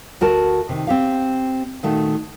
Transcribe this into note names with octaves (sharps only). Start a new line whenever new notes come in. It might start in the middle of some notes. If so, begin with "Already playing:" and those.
D2 F#4 A#4 A5
C3 D#3
C4 G4 F5
A#2 D#3 A3 F#4